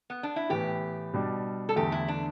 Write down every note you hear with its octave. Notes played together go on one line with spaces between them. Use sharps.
B3
D4
E4
A2 E3 B3 G4
B2 G3 D4
A4
E2 D3 A3 G4
E4
D4